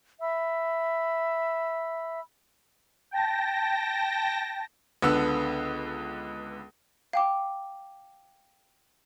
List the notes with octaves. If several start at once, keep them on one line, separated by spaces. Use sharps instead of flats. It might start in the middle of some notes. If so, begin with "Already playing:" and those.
E5 B5 E6
G5 A5 A#6
C#2 D3 B3 E6
F5 G5 D6